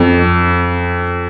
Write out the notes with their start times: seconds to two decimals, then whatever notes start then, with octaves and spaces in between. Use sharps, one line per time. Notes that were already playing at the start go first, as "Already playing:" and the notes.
Already playing: F2